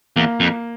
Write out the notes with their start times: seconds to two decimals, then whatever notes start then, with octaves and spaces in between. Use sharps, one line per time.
0.16 E2 A#3
0.40 F2